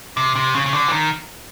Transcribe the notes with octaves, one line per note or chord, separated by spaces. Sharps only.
C3
C3
C#3
C#3
D3
E3
D#3